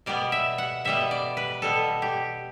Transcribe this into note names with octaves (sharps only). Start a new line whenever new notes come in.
B2 G3 B3 D5
E5
F#5
B2 G3 B3 E5
D5
B4
B2 G3 B3 A4
G4